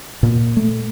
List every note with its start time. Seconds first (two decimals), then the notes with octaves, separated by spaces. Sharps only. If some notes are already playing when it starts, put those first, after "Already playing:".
0.23 A#2
0.57 A3